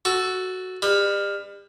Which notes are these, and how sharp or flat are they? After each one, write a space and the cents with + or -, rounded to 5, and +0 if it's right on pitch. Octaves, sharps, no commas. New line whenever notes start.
F#4 +0 A4 +0 C#6 +30
G3 +35 B4 +0